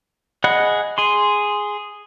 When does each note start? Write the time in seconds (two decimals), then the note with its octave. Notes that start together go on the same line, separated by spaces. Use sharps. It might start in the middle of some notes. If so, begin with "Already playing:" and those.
0.44 G#4 D#5 F#5 B5 F#6
0.98 G#4 C6